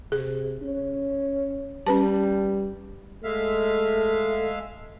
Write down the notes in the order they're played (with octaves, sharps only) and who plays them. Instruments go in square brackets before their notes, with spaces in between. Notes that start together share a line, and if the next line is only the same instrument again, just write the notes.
[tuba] C3 [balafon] G#4
[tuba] C#4
[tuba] G3 [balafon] C#4 B4 A5
[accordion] G#3 E5 F5 [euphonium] A3